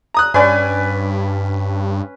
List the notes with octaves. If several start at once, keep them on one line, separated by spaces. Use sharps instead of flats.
A#5 D#6 F#6
G2 C#4 B4 D5 G#5